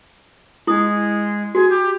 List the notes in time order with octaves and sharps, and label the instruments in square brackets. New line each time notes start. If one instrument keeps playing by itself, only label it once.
[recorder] G#3 [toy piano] E4 D#6
[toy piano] F#4 [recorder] G#4
[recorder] G4